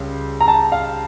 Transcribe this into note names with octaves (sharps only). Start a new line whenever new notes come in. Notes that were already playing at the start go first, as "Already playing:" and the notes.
Already playing: C#2 C#3 G3
A#5
A5
F5